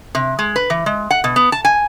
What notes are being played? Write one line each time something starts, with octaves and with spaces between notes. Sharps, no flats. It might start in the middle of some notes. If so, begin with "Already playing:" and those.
C3
G#3
B4
E3
G#3
F#5
B2
B3
A5
G#5